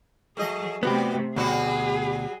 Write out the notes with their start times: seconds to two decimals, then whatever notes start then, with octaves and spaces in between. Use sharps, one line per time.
0.37 F#3 A3 G#4 D#5
0.83 C3 G3 A3 B3 F#4 G4
1.36 D2 B2 F#3 G3 F#4 G#4